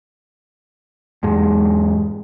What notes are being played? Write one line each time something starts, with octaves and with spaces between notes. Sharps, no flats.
E2 G#2 G#3